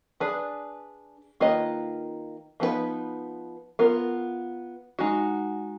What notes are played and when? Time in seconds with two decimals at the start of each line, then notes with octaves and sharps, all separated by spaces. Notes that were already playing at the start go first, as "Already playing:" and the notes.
0.20 D4 G#4 B4 D5
1.40 D#3 A#3 F4 B4 D#5
2.60 F3 B3 D#4 F#4 B4
3.79 B3 F4 A#4
4.99 G#3 D#4 F#4